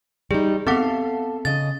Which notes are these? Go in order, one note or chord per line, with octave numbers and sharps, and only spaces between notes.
G3 D#4 G#4
B3 C4 A4 F5 F#5
C#3 D#5 A6